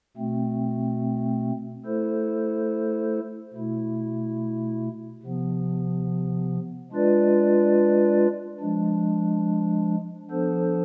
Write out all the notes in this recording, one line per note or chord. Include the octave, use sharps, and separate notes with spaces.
B2 A3 C4
A3 E4 A4 C5
B2 A3 E4
C3 F3 B3
G#3 D4 F4 B4 D5
F3 G#3 D4
F3 B3 D4 A4 C5